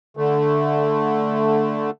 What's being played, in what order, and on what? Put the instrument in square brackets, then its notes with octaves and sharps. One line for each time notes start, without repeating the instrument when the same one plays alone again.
[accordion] D3 A3